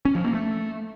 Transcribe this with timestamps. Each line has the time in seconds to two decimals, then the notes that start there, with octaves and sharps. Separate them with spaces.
0.05 C#4
0.15 F3
0.24 A#3
0.34 A3